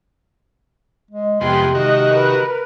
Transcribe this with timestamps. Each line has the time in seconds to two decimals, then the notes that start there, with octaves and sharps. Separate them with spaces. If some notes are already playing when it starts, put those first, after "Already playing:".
1.11 G#3
1.41 F2 C3 G#3 B3 G5 C6
1.75 D#3 G#3 F#4 D#5
2.13 A#4 B4